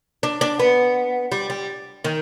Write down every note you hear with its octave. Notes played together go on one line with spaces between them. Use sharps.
D4
D4
B3
G3
G3
D#3